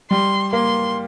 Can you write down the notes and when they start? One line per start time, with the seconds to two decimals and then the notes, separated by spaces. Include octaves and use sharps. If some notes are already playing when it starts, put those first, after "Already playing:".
0.11 G3 C6
0.53 A#3 C6